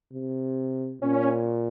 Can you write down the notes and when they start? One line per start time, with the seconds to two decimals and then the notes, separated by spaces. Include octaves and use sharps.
0.12 C3
1.02 A#2 C#4